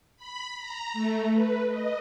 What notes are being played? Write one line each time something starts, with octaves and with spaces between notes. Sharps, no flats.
B5
A#5
A3
B4
D#5